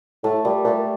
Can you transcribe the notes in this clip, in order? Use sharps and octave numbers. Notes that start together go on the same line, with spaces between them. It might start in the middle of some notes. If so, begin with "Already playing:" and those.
A2 A3
A#2 G3
A#2 A3